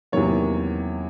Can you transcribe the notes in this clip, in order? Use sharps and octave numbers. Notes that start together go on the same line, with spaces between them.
E2 C3 D#3 F#3 A#3 C#5